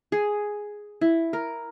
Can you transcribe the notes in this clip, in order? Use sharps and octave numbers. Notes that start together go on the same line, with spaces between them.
G#4
E4
A#4